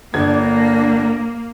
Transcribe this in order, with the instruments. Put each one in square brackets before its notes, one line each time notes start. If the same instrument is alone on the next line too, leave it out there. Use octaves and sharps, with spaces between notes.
[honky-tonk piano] G1 G#6 [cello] A#3 [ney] D4